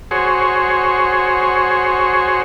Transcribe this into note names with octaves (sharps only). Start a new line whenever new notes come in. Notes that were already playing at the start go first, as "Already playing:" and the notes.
F#4 G#4 C5 C#5